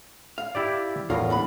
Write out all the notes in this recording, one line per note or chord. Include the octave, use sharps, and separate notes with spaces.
F5
E4 G4 D5
E2 A2 F4 A#4
G2 B4 B5